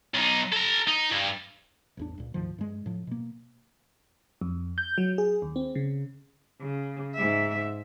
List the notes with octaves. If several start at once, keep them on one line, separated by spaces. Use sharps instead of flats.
B1 D#4
A4 A#5
D#4
G2
A1 E2 D4
C#2 A#2
D2 G#2 D#3 F3
G2 G#3
A2 F3
B2 A#3
F2
G6
F#3
G#4
D#2
C4
C#3
C#3
G#2 E5